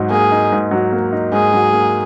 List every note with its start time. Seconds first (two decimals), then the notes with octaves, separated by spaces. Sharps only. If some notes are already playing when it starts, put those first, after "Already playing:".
Already playing: G#2 F#3 D#4
0.11 A#3 G#4
0.32 D#4
0.52 G#2
0.71 F#3
0.92 A#3
1.12 D#4
1.32 G#2 G#4
1.53 F#3
1.73 A#3